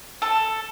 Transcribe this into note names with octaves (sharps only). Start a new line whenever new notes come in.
A4